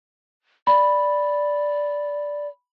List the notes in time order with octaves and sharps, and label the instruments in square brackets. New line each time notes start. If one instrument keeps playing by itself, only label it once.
[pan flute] D5 [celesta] B5